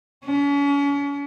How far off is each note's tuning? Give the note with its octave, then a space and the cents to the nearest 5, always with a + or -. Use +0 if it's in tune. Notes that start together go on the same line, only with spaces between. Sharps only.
C#4 +40